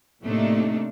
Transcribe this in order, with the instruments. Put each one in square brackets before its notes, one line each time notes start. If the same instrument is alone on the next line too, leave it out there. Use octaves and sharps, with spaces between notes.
[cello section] A2 C3 A3 A#3 D4 D#4